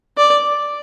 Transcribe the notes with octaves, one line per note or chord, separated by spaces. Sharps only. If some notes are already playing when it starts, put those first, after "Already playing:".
D5